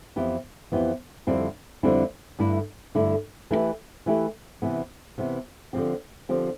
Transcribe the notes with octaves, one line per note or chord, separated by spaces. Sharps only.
F2 E3 B3 E4 G4
F2 E3 B3 E4 G4
F2 D3 G3 C4 E4
F2 D3 G3 C4 E4
G2 D3 A3 E4
G2 D3 A3 E4
E3 A3 E4 G4 B4
E3 A3 E4 G4 B4
C3 E3 B3
C3 E3 B3
D3 F3 C4 G4
D3 F3 C4 G4